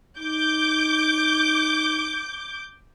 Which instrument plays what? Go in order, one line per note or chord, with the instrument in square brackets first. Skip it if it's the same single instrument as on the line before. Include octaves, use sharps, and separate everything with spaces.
[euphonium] D#4 [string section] D6 G6